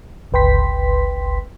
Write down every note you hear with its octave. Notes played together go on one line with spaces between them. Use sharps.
G1 C#2 B4 G5 C6 B6